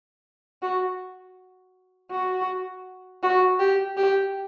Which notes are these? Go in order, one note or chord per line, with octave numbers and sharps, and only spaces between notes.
F#4
F#4
F#4
G4
G4